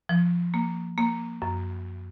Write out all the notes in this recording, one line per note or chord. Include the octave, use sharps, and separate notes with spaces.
F3
A#3
A#3
F#2